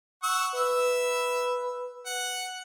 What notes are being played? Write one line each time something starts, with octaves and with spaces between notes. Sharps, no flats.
F#5 C#6 E6
B4 E5
F#5